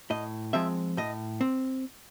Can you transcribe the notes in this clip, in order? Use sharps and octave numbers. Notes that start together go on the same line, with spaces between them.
A2 D#5
F3 G#3 C4 E5
A2 D#5
C4